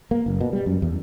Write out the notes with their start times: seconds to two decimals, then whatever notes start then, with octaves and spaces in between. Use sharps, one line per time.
0.11 A#3
0.26 F#1
0.41 B2
0.53 G3
0.66 F#2
0.82 E2